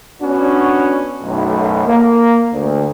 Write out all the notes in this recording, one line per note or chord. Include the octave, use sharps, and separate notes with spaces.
B3 C#4 D4 F#4
B1 F#2 A2
A#3
D2